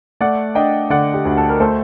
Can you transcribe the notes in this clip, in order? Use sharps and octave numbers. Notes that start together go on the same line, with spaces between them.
A3 D5 F#5
D4 D#5 G5
D3 D5 F#5
G4
D2
A4
A#4
A3 A4 C5